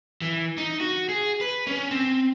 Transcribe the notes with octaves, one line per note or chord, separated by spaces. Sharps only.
E3
D#4
F#4
G#4
B4
C#4
C4